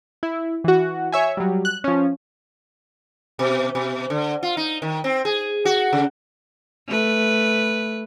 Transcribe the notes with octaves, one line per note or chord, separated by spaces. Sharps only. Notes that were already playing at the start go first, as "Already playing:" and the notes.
E4
E3 F#4
C#5 E5 G#5
F#3 G3
F#6
F3 C#4
B2
B2
D3
F4
D#4
D#3
C4
G#4
F#4
C#3
A3 B4